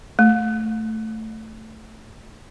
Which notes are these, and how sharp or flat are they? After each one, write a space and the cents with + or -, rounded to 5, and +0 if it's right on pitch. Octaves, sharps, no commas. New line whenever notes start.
A3 +5